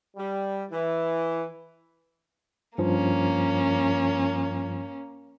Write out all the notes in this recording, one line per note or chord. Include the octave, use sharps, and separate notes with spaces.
G3
E3
G2 F3 A#3 C#4